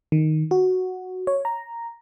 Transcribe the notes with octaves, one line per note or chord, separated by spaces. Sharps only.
D#3
F#4
C#5
A#5